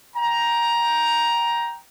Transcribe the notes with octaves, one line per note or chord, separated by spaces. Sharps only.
G5 A#5